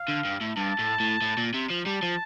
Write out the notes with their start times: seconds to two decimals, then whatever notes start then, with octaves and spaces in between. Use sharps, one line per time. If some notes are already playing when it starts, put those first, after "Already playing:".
Already playing: F5
0.08 D3
0.25 G2
0.41 A2
0.57 G2 A5
0.79 A2
1.00 A2
1.22 A2
1.37 A#2
1.54 C3
1.70 F3
1.86 G3 A5
2.02 F3